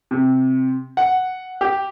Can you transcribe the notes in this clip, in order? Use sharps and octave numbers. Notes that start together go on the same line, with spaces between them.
C3
F#5
G4